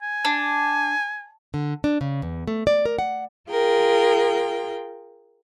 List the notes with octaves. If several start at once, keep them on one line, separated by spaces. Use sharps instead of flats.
G#5
D4
D3
D4
C#3
E2
A3
D5
A#4
F#5
F4 G#4 A#4 G5